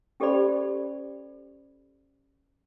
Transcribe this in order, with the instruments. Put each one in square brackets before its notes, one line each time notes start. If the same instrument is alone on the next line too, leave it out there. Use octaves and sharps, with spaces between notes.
[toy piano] C#4 G4 A4 C5 D5 B5